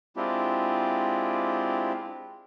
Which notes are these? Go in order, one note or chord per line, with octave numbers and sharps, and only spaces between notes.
G#3 C4 D4 E4 F4 G4